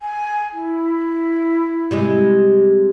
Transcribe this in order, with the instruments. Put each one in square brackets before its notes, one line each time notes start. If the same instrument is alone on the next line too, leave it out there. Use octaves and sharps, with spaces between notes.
[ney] G#5
E4
[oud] C3 G3 G#3